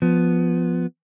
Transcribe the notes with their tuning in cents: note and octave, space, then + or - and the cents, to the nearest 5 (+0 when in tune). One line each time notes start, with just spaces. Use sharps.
F3 +0 B3 +0